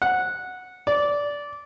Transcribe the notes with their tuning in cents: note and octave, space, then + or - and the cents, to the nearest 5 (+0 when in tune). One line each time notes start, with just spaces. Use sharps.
F#5 -10
D5 -15